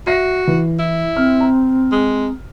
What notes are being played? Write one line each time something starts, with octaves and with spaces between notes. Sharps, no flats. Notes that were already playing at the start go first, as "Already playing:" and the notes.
F#4 E5 A#6 C7
E3
E4
C4 F6
A#5
G#3